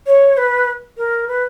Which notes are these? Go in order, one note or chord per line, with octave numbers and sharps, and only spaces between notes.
C#5
B4
A#4
B4